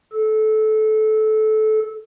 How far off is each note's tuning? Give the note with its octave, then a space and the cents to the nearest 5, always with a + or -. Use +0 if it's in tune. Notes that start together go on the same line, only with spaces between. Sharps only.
A4 -20